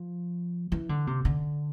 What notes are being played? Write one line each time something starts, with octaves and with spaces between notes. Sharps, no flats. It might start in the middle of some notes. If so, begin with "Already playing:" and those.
Already playing: F3
E3
D3
C3
D3